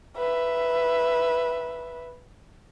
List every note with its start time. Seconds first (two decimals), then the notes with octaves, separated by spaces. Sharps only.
0.17 B4 E5